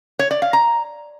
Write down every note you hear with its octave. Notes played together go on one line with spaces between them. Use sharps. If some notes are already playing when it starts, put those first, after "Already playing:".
C#5
D5
F5
A#5